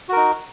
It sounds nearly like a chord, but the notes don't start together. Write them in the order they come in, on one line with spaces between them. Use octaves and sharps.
F#4 A#4 D#4